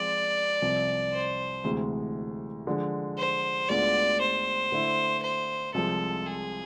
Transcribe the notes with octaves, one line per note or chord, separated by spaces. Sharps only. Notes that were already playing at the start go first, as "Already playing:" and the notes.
Already playing: F3 G#3 C4 F4 D5
C2 C3 F3
C5
D2 C3 E3 G#3
D3 F3 G#3
C5
D2 D3 G#3 B3 F4 D5
C5
D3 A3 E4
C5
C2 C3 F3 G#3 A4
G#4